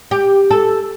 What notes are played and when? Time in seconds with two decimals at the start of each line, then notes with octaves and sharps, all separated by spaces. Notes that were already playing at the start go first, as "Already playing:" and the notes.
0.11 G4
0.51 A4